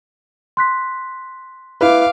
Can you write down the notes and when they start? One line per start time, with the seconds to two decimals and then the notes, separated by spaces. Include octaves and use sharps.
0.57 C6 F#6 B6
1.81 E4 B4 F5 D6